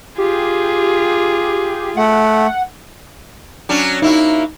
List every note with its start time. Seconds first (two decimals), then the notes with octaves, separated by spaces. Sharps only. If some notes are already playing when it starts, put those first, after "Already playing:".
0.18 F4 G4 G#4
1.97 A3 F#5
3.69 F#3 C#4 D4
4.02 A#3 D#4 E4 F#4